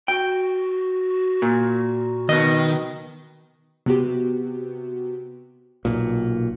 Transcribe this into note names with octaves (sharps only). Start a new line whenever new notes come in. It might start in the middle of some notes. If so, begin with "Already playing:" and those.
F#4 G5
A#2
B2 D#3 D#5
C3 B3 F#4 G4
B1 A#2